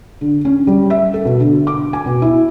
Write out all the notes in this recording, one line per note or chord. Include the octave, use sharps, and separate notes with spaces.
D3
C#4
G3
E5
A4
B2
D3
D6
G#5
B2
E4